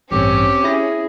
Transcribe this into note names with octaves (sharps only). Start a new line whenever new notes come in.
A1 G2 C4 C#4 G4
E4 G#4 A#6